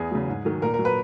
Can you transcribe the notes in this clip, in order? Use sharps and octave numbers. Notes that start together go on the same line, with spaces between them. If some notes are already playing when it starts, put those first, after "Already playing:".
Already playing: E2 G#4
C#3 F#3
G#2
D#3 F#3
A#2 A#4
A#4
F#3
B4